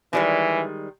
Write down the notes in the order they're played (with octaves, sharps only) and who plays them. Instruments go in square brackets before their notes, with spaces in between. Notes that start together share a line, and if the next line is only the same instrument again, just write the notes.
[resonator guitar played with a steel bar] D#3 G3 G#3 [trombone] E3